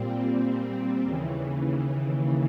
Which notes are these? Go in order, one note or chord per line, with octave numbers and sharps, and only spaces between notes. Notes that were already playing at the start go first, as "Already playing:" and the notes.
Already playing: A#2 G3 C4
D#2 C#3 E3